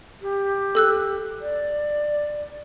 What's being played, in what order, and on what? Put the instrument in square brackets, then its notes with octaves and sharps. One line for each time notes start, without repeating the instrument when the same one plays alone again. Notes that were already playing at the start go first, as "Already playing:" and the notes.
[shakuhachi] G4
[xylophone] A4 E6 F#6
[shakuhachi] D5